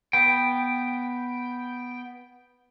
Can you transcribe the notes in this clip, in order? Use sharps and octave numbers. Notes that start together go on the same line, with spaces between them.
B3 G5